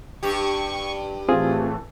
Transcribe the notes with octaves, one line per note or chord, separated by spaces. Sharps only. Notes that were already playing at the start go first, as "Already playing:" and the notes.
G2 G4 C#6
A2 E3 A3 C4 F4 G#4